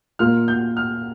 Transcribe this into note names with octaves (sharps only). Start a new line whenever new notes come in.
A#2 A#3 F4 F6
G6
F6